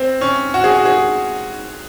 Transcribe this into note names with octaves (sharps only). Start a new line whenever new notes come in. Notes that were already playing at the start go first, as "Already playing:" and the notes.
Already playing: C4
C#4
F#4
G#4
F#4
G#4